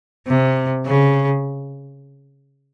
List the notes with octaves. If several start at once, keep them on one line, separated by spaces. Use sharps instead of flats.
C3
C#3